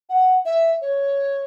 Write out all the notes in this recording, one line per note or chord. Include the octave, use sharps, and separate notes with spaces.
F#5
E5
C#5